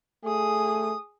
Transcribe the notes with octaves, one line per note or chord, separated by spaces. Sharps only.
A3 G#4 D#6